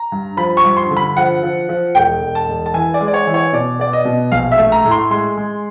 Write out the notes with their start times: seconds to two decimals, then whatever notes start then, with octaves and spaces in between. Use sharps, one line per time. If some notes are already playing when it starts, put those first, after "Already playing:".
Already playing: A#5
0.12 G2
0.37 F3 B5
0.57 C#6
0.64 G2
0.77 C6
0.90 D3
0.97 B5
1.17 F3 F#5
1.43 F3
1.69 F3
1.95 E1 G5
2.21 E1
2.35 A5
2.48 E1
2.66 A5
2.74 E3 G#5
2.94 D5
3.01 G#3
3.08 D5
3.14 C#5
3.27 E3
3.34 C#5
3.53 B2 D5
3.79 B3 D5
3.93 D#5
4.05 B2
4.32 A#1 F5
4.52 E5
4.58 A3
4.72 A#5
4.85 A2
4.91 C6
5.11 G#3 C6
5.37 G#3